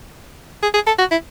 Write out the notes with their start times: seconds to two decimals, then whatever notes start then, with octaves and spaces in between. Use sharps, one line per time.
0.63 G#4
0.74 G#4
0.87 A4
0.99 F#4
1.11 E4